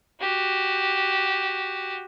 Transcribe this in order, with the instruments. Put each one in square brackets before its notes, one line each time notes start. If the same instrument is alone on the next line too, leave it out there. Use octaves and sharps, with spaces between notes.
[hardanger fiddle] F#4 G4